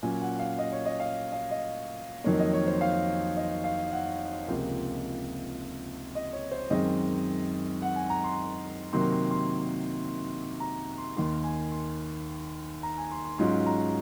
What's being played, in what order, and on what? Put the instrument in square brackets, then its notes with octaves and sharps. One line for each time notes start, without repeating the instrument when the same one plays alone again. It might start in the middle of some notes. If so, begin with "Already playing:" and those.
[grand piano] A#2 F#3 C#4 G#5
F#5
F5
D#5
C#5
D#5
F5
F5
D#5
F2 D#3 F#3 A#3 C#5
D#5
C#5
C5
F5
D#5
F5
F#5
C#2 C3 F3 A#3
D#5
C#5
C5
F#2 D#3 G#3 C4 D#5
F#5
G#5
A#5
C6
C3 D#3 F#3 A#3 C6
C6
C6
A#5
C6
D#2 D#3 A#3 C6
G#5
C6
A#5
G#5
C6
C6
G#2 F#3 C#4 F4 C6
A#5